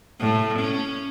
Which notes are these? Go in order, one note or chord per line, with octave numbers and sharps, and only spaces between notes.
A2
C#4